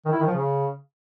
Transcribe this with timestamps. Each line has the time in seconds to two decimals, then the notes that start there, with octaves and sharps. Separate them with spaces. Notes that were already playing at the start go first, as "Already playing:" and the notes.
0.05 D#3
0.13 E4
0.20 D#3
0.27 F3
0.34 C#3